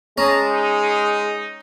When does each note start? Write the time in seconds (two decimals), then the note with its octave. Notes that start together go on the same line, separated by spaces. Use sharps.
0.18 G#3 C#4 G#4 A5 A#5
0.50 D#4